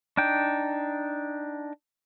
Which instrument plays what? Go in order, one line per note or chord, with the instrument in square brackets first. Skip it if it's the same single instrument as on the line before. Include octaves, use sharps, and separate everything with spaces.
[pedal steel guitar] D4 D#4 G5